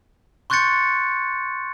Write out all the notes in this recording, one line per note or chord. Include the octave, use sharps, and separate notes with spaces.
C6 C#6 F#6 G6 A6 C#7